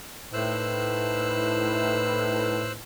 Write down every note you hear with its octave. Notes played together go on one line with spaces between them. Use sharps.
A2 D#4 E4 B4 C5 E6 F#6